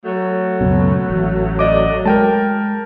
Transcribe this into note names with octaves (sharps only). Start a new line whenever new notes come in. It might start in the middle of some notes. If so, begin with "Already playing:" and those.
F#3 A3
C#2 F#2 B2
A1
D5 D#5 D6
G#3 A#4 G5 A5